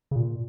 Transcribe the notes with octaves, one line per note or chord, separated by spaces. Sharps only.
C#3
A#2